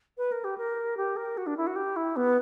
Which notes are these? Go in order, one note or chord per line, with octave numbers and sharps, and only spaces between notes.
B4
A#4
G4
A#4
G4
A#4
F#4
D4
E4
F#4
G4
E4
B3